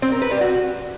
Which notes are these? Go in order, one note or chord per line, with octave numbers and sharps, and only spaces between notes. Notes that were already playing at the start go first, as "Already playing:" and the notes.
C4
A#4
B4
G3
F#4